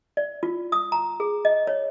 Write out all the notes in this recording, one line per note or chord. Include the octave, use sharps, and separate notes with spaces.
D5
F4
D#6
A#5
G#4
D#5
C#5